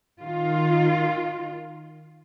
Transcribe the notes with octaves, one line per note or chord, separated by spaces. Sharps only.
D#3 F4